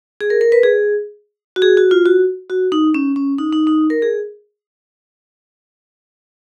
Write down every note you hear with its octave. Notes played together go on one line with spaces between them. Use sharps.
G#4
A#4
A#4
B4
G#4
F#4
G#4
F#4
F4
F#4
F#4
D#4
C#4
C#4
D#4
D#4
D#4
A#4
G#4